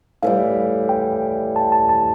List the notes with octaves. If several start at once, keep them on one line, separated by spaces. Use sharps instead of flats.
A2 E3 G3 F5
G5
A5
A5
A5